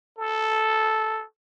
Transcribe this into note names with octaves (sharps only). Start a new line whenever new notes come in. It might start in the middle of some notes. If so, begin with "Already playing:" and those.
A4